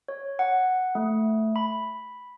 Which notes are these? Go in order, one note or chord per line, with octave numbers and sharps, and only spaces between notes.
C#5
F#5
A3
B5